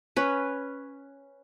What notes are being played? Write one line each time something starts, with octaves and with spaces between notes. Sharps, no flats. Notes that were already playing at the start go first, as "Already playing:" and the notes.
C#4 B4